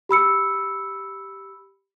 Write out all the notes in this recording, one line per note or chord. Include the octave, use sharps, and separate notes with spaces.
G4 B5 E6 C#7